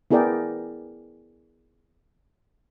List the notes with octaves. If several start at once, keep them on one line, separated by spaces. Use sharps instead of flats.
B3 E4 G#4 A#4 D5 G5